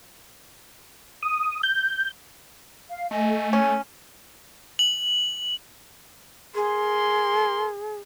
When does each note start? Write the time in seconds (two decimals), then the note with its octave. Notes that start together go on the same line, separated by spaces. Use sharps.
1.23 D#6
1.63 G6
2.90 F5
3.11 A3 D#5 G#5
3.53 C#4 C#5 G#5
4.79 F#7
6.55 G#4 A#4 C6